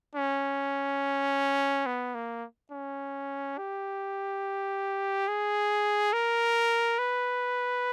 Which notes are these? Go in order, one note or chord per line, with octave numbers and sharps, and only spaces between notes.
C#4
B3
A#3
C#4
G4
G#4
A#4
B4